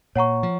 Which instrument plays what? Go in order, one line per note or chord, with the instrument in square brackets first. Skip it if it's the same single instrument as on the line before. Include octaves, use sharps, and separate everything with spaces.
[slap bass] A#2 [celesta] C#5 F#5 A#5 C#6
[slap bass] F3